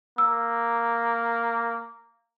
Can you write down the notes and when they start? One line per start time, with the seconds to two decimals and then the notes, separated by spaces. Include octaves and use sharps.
0.18 A#3 E6